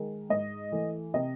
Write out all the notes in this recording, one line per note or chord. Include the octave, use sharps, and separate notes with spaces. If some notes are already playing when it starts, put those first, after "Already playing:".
Already playing: D#3 G#3
G#2 D#5
E3 A3
C3 D#5